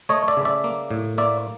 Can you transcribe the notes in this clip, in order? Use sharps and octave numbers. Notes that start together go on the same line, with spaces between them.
A3 C#5 D#5
D5 E5
C#3
D5 E5
A#3
A2
A#3 D5 E5